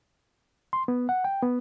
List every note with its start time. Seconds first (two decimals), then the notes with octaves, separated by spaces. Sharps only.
0.73 C6
0.88 B3
1.09 F#5
1.24 G5
1.43 B3